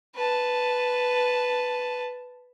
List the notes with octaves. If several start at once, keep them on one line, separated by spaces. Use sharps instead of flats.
B4 A5